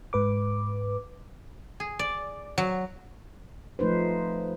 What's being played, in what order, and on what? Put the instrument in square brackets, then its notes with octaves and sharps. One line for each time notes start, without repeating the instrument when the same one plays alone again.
[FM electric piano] G#2 B4 D6
[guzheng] G#4
D5
F#3
[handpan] F3 A3 D#4 B4 C5